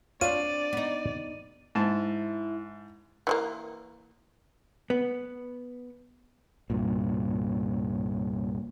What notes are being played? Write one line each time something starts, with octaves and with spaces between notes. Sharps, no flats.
C4 D4 F4 C#5 D5 F5 D#7
B3 D#4
G#2 E4 A5
E3 G#3 A#3
B3
C2 G2 A#2